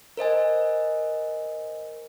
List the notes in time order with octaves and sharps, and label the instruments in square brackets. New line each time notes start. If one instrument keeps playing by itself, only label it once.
[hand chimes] A#4 C5 D#5 G#5